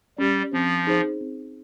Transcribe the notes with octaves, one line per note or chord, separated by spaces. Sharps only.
G3 C#4 G4
F3 C4
D#4 G#4 C5
C4